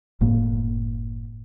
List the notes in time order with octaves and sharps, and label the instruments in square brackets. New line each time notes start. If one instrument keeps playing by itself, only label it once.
[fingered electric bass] F#1 A2 A#3